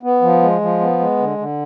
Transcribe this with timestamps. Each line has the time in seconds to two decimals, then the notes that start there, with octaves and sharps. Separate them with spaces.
0.03 B3
0.22 F3
0.42 G#3
0.61 F3
0.80 B3
0.99 G#3
1.18 D3
1.38 D3